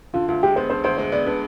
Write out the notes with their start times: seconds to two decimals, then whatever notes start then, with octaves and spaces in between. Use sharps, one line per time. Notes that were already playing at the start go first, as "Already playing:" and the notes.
0.14 D3 F4
0.28 D2 F4
0.43 G#3 G4
0.56 B3 C5
0.70 D3 C5
0.84 D2 C5
0.98 G#3 C5
1.12 B3 D5
1.26 D3 B4